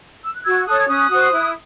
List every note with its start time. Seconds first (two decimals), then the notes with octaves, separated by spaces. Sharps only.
0.24 E6
0.34 F#6
0.45 F#4 E6 G#6
0.66 A4 C#5 D#6 F#6
0.79 G#6
0.88 C#4 D#6 F#6
1.10 F#4 C5
1.32 E4